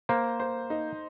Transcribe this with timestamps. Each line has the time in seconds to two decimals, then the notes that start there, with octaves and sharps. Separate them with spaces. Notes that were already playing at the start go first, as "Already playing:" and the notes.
0.09 A#3 C5
0.40 C5
0.70 D#4